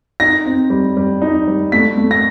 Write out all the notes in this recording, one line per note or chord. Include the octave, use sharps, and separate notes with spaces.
D#4 A#6
C4
G3
G3
D#4
G3
A3 B6
A3
A#6